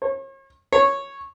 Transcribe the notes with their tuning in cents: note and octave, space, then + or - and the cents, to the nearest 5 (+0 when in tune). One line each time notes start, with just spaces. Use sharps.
C#5 -40
C#5 -5